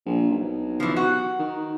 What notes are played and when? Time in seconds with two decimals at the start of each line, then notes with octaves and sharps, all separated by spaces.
0.06 A#1
0.31 B1
0.80 E3 F3
0.96 F#4
1.39 D#3